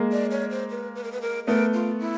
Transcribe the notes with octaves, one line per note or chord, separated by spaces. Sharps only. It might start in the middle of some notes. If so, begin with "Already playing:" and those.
Already playing: G#3 A#3
D5
C#5
C5
B4
B4
A#4
B4
A#4
A3 B3 A#4
F4
E4